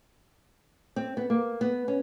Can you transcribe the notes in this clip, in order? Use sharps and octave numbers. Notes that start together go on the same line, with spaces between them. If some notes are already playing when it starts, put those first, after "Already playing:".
C4
B3
A#3
B3
C#4